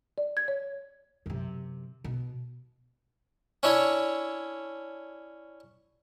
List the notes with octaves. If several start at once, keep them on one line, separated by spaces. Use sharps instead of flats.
D5
G#6
C#5
F#2 C3
B2
C#4 D4 E4 C#5